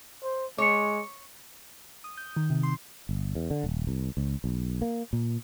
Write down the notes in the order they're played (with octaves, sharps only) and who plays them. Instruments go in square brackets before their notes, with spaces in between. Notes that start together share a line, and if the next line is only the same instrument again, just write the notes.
[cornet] C5
[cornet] G#3 [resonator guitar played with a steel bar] C#5 [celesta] D6 C#7
[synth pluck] D#6
G6
D#3
C3
C6
[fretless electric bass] G1
E2
D3
D#1
C2
C#2
B1
A#3
A#2